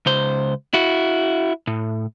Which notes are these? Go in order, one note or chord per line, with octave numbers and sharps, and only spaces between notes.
C#2 C5
E4 F#4
A2